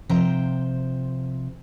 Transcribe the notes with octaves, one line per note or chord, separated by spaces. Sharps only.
C3 F3 C5 G5 A#5